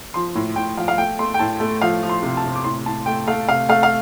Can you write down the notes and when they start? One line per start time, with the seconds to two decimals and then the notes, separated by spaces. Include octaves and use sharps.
0.14 F3 C6
0.35 A2
0.56 A2 G5
0.77 F3 F5
0.88 F5
0.98 A3 G5
1.19 A3 C6
1.34 G5
1.39 A2 A5
1.60 A3
1.82 F3 F5
2.03 F3
2.09 C6
2.23 C3
2.37 A5
2.44 C3
2.55 D6
2.64 A2 C6
2.86 A2 A5
3.06 A3 G5
3.27 A3 F5
3.48 C3 F5
3.69 A3 F5
3.83 F5